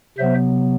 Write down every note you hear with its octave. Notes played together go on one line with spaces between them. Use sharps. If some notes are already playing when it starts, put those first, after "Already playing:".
C3 F#3 B3 C5 E5